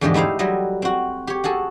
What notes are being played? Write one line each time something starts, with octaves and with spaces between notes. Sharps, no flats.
E2 G#2 D3 F3 G4 D#5
A3 D#4 E4 C5 F5
F#3 G3 E4 D#5
C4 F#4
G4 C#5
F#4 G#4 A4 G#5